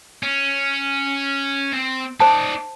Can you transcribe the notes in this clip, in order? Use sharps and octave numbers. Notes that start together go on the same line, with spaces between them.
C#4
C4
D#4 C5 D5 A5